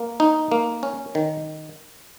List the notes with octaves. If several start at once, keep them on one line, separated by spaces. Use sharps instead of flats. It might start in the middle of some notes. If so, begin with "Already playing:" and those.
Already playing: A#3
D#4
A#3
C#4
D#3